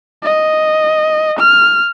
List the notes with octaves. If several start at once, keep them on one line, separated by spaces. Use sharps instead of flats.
D#5
F6